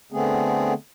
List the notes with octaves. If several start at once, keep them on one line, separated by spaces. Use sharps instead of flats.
D3 A3 B3 C4 G#4